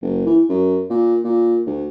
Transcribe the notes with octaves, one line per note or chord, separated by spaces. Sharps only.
F#1
E3
F#2
A#2
A#2
D2